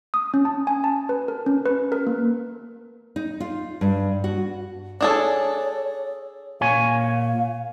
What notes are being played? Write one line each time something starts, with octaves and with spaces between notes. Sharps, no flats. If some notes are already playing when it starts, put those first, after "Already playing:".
D#6
C#4
A5
G#5
A5
B4
A#4
C#4
B4
A#4
A#3
D#4
F4
G2
F#4
D4 G#4 A4 C#5
A#2 C#5 F5 G#5